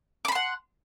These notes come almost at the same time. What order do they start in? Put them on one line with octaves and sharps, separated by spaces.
D6 B5 C6 F#5